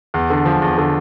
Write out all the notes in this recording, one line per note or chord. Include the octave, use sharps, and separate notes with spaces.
E2
D3
F3
E2
D3